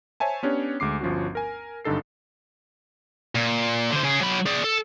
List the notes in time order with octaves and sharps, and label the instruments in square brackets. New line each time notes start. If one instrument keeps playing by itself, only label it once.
[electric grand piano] C5 C#5 E5 G#5 A5
B3 C#4 D4 G4 C#5
D2 G#3 D6 C7
G1 F3 C#4 F#4
A#4 G#5
G#1 G2 D3 D#4 A4 C7
[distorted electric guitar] A#2
D3 C5
C#3 G#4
F#3 B5
G#4 D5
A4